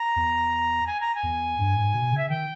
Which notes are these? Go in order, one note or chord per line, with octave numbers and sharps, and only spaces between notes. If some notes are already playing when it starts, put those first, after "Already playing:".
Already playing: A#5
E2
G#5
A#5
G#5
E2
G2
G#2
B2
C#3
E5
D#3 G5